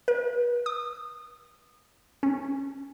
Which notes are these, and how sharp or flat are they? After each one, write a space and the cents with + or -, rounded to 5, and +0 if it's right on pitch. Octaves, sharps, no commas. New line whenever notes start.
B4 -40
D#6 -30
C#4 -15